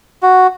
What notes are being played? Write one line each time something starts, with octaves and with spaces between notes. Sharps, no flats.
F#4